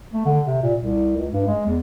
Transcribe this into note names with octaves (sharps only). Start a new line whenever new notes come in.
A3
D3
C3
A#2
C2
C#2
G2
G#3
E2